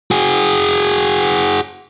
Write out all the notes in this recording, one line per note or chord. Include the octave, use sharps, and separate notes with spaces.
F#4 G#4